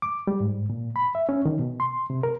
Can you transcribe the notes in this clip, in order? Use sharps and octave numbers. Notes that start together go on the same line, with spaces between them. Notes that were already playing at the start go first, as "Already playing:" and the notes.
D6
G3
G#2
A#2
B5
E5
C#4
D#3
B2
C6
C3
A#4